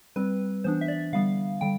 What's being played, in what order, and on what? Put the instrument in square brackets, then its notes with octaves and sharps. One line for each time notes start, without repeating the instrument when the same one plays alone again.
[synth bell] G3 C4 B4
E3 B3 D4 C5
E5
D5
D3 G3 B3 F5
D3 G3 G5